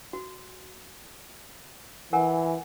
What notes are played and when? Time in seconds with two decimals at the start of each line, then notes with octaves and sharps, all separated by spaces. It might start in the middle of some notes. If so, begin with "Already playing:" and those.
0.13 F#4
2.13 E3 A#4 F#5 G#5